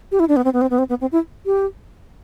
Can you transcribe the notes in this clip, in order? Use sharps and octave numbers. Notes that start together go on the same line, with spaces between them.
G4
E4
D4
B3
C4
B3
C4
B3
C4
B3
C4
E4
G4